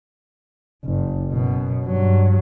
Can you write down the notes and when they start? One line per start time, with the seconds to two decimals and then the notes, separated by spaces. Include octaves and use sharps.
0.84 F#1
1.31 F#2 B2
1.85 G2 F#3